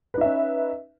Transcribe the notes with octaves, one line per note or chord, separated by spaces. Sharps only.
C#4 D#4 B4 E5